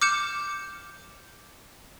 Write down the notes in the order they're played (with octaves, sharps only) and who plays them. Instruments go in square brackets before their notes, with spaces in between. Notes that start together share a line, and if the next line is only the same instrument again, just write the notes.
[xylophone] D6 F6 G6 C#7 E7